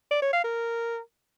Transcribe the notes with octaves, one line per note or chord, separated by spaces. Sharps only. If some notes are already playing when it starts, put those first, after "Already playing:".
D5
C#5
F5
A#4